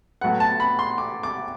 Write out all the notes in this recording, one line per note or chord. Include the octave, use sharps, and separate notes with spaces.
A2 F#3 B3 F#5
A5
B5
C6
D6
D6